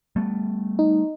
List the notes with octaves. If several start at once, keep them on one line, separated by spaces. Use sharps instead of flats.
G3 A3 B3
D#4